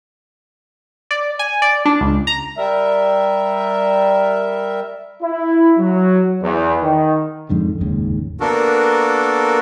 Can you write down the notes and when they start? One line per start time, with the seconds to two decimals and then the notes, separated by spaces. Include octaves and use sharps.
1.11 D5
1.39 G#5
1.62 D5
1.85 D4
2.01 C#2
2.27 A#5
2.57 G3 A#4 E5
5.23 E4
5.78 F#3
6.43 E2
6.82 D#3
7.49 F2 G#2 D3
7.81 F1 D#2 G#2 C#3
8.40 A#3 B3 D4 F#4 A4 A#4